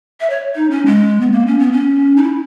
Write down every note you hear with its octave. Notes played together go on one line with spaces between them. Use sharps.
E5
C#5
D#4
C#4
G#3
B3
A#3
C#4
B3
C#4
D#4
E4